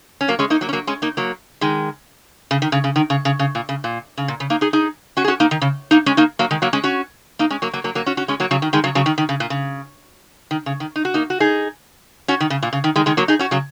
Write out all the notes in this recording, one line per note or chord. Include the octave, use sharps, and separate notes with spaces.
C#4
F#3 A#3
G#3 C#4
A#3 D#4
F#3 A#3
C#4
F#3 A#3
G#3 C#4
A#3 D#4
F#3 A#3
D#3 G#3
C#3
D#3
C#3
C#3
D#3
C#3
C#3
C#3
A#2
C#3
A#2
C#3
A#2
C#3
A#3 D#4
D#4 G#4
D#4 G#4
C#4 F#4
G#4
C#4 F#4
A#3 D#4
D#3
C#3
A#3 D#4
G#3 C#4
A#3 D#4
F#3 A#3
D#3 G#3
F#3 A#3
G#3 C#4
C#4 F#4
A#3 D#4
G#3 C#4
F#3 A#3
F#3 A#3
F#3 A#3
F#3 A#3
C#4 F#4
C#4 F#4
G#3 C#4
F#3 A#3
C#3 F#3
D#3
D#3 G#3
C#3 F#3
C#3 F#3
D#3
D#3
C#3
A#2
C#3
D#3
C#3
D#3
D#4
F#4
A#3 D#4
F#4
D#4 G#4
C#4 F#4
D#3
C#3
A#2
C#3
D#3
D#3 G#3
D#3 G#3
F#3 A#3
D#4 G#4
C#4 F#4
C#3 F#3